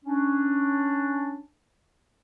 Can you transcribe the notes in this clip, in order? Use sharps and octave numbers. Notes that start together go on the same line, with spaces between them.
C#4 D4